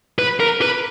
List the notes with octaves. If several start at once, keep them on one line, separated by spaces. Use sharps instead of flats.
B4
A#4
B4